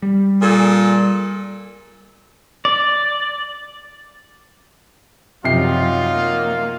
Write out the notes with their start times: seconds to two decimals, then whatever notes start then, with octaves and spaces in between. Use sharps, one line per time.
0.02 G3
0.40 A#2 G#4 A4
2.65 D5
5.44 F#2 C3 F3 F#3 D#4 F4 C7
6.13 A#3